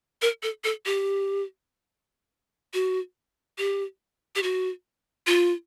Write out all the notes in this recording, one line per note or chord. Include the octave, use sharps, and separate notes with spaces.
A#4
A4
A4
G4
F#4
G4
G4
F#4
F4